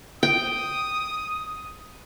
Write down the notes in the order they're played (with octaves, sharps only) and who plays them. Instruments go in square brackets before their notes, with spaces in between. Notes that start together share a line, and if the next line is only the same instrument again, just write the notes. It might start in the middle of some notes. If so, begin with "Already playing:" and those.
[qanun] G5 [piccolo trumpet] D#6